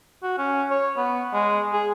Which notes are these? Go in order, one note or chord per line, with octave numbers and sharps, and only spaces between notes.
F#4
C#4
C#5
B3
G#3
G#4